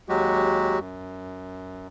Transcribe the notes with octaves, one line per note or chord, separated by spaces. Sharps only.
D#2 F#3 G#3 F#4 G4
F#2